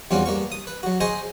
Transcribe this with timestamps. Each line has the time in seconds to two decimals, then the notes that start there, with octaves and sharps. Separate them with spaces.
0.11 E2 G3 C4 C#4 F4 F#4
0.26 G2 A#3 C#6
0.52 D#6
0.67 B4
0.83 F#3 F#4
1.00 G#4 C5 D#5 G#5 C6 C#6